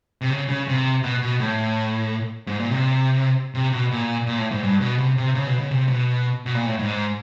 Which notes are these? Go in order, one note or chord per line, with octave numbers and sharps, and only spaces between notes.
C3
C#3
C#3
C3
B2
B2
A2
G#2
A#2
C3
C3
B2
A#2
A#2
A2
G#2
G2
B2
C3
C3
C#3
B2
C#3
C3
B2
B2
A#2
A2
G#2